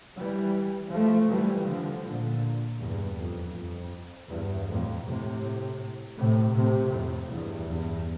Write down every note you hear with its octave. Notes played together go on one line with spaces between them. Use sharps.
E3 G3
F3 A3
E3 G3
D3 F3
A#2 D3
E2 G2
F2
F2
E2 G2
F2 A2
A2 C3
A2 C3
A2 C3
F2 A2
E2 G2
E2 G2